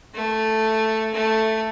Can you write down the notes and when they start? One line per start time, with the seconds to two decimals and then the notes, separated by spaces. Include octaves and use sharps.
0.14 A3
1.14 A3